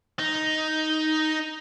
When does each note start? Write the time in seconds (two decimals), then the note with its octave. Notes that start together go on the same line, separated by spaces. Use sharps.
0.19 D#4